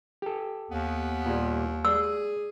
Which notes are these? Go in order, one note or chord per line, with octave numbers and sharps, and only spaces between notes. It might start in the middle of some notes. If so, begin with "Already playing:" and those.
G4 A4
D#2 B3
A#2 G3
G#4 D5 E6